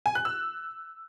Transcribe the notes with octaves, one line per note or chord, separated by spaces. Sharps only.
G#5
F#6
E6